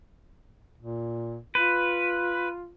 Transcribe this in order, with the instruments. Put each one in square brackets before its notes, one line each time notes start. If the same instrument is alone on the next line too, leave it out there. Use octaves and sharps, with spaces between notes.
[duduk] A#2
[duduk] F4 [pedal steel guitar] B4